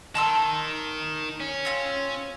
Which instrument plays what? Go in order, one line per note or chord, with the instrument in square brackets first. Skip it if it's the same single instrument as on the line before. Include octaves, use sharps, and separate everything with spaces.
[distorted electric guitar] D#3 [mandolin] A5 C6 E6
[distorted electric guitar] C#4
[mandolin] C4 F4